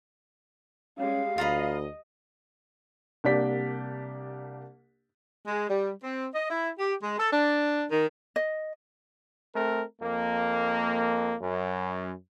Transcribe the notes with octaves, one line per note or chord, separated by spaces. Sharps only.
G3 G#3 C#4 F5
D2 F4 D#5 A#5 B5
C2 A#3 D4 G4 D5 B6
G#3
G3
C4
D#5
E4
G4
G#3
A4
D4
D#3
D#5
A3 C4 A#4
F2 A#3
F#2